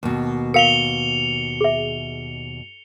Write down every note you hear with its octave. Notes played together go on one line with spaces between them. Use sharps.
D#2 B2
A#4 F5 C#7 F7 G7
G#4 E5